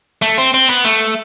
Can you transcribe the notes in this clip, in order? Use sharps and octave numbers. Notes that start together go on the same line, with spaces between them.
A3
C4
C4
B3
A3